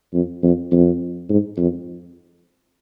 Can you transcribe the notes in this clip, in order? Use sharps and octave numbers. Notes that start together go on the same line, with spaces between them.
F2
F2
F2
G#2
F2